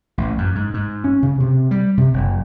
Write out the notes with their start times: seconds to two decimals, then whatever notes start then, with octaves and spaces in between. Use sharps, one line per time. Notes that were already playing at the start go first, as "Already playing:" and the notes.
0.18 A1
0.38 F#2
0.55 G#2
0.74 G#2
1.04 C#4
1.23 C#3
1.40 C3
1.71 G3
1.97 C3
2.14 F#1